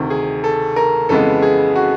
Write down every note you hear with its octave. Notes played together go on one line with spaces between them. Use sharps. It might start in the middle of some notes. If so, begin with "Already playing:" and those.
Already playing: D2 C3 D#3
G#4
A4
A#4
F2 C#3 E3 G#3 B3 A4
G#4
F#4